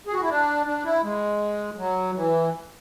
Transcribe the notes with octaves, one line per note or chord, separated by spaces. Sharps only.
G#4
F#4
E4
D4
D4
E4
G#3
F#3
E3